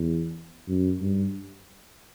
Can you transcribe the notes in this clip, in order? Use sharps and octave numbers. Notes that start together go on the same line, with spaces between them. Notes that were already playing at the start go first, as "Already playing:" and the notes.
Already playing: E2
F#2
G2